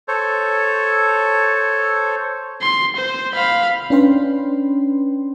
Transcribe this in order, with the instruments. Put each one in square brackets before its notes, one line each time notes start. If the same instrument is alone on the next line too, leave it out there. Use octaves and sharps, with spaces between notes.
[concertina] A4 C5 C#5
[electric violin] C6
C5
F5 B5
[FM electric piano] C#4 D4 B4 G5 C6